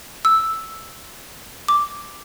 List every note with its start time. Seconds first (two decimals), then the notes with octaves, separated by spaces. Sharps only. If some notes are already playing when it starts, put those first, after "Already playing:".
0.25 E6
1.68 D6